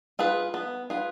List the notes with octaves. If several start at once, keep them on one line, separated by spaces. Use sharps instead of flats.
F4 G#4 B4
B3
F4 G#4 B4